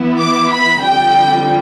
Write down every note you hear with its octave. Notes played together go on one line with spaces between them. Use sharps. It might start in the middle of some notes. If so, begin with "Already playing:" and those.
Already playing: E3 B3 E4
D6
B5
F2 D3 G3 G5